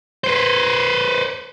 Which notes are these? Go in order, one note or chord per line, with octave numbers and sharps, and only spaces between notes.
B4 C5